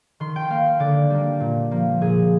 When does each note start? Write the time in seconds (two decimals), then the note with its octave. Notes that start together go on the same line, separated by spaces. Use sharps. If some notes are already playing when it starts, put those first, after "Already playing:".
0.20 D#3 C6
0.36 G5
0.50 A#3 F5
0.80 D3 D5
1.10 G3 A#3
1.40 A#2
1.71 F3 A#3
2.01 A#2 G#4